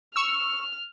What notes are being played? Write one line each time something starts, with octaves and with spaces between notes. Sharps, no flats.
C#6 E6 F6